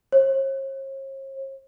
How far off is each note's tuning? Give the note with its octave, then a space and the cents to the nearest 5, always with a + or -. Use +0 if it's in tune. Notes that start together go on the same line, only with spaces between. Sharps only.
C#5 -45